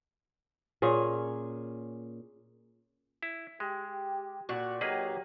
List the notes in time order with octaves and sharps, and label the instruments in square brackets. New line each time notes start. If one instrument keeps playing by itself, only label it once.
[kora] A#2 C#4 G#4
[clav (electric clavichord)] E4
[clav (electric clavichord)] G#3 [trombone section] G4
[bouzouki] A#2 F#4
[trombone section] F#3 G4 [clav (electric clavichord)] A#3 G#4 B4 [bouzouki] D#4